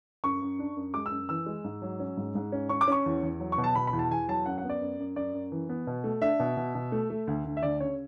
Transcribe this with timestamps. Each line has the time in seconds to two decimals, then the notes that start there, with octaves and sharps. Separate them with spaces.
0.24 F#2 C#6
0.42 F#2
0.59 D4
0.77 F#2
0.94 G#3 D6
1.06 E6
1.11 F#2
1.29 E3 E6
1.46 G#3
1.64 G#2
1.82 F#3
2.00 C#4
2.17 G#2
2.35 G#2
2.52 C#4
2.69 C#4 C#6
2.81 D6
2.88 C#4 C#6
3.06 E2
3.23 E2
3.40 F#3
3.52 C#6
3.58 B2
3.64 A5
3.75 B2 B5
3.87 B5
3.93 E2
3.99 A5
4.11 E2 G#5
4.28 F#3 A5
4.46 F#2 F#5
4.58 F#5
4.64 B3
4.69 D5
4.81 F#2
4.99 F#2
5.16 F#2 D5
5.34 F#2
5.52 E3
5.69 B3
5.87 B2
6.04 A3
6.21 D4 E5
6.40 B2
6.57 B2
6.75 B2
6.92 A3
7.10 A3
7.27 D2
7.45 D2
7.57 E5
7.62 D2 D5
7.80 C#3 C#5